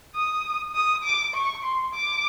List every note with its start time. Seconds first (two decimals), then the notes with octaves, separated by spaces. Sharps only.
0.15 D#6
0.75 D#6
1.04 D6
1.35 C#6
1.64 C6
1.94 D6